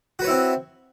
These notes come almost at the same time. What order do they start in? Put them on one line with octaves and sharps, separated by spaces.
F#4 B4 C#5 E4 C4